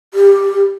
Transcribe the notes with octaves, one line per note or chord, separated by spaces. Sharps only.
G4